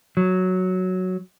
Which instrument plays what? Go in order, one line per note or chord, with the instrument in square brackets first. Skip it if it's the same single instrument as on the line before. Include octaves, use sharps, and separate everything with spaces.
[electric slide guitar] F#3